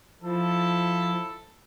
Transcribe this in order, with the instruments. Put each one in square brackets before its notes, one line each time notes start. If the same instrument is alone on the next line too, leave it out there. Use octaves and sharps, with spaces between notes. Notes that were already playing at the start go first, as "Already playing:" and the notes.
[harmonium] F3 [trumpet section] E4 A4